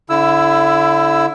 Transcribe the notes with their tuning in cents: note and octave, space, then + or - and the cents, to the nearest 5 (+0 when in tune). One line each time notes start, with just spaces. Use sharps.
D3 -20 E4 +15 E6 +5